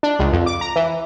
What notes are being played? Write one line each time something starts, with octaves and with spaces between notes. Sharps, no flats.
D4
C#2
F2
D6
A#5
E3